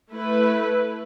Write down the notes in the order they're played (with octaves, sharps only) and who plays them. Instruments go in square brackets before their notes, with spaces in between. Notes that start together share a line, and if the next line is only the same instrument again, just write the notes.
[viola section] A3 E4 B4